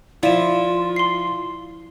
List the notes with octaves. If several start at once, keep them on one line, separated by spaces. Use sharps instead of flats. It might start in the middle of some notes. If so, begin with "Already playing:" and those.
F3 E4 F4 D5 E7
C6 C7